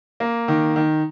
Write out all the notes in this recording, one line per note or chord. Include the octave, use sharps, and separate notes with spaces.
A#3
D#3
D#3